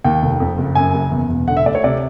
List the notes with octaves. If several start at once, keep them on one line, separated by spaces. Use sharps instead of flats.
D#2 G5
F1
F2
F#1
F#2 G#5
F#1
E2
E1
D3 F#5
E5
D2 D5
C#5
C3 D5